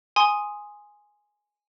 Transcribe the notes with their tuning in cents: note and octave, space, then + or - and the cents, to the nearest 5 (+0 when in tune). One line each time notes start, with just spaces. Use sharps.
G#5 +0 C6 +0 D#6 +0